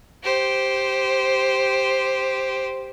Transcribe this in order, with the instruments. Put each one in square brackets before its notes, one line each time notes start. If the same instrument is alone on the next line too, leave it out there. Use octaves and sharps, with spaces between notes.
[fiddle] G4 C5